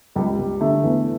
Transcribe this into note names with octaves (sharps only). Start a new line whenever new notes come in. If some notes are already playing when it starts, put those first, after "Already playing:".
C#2 G3
C#2
D3 A3
E2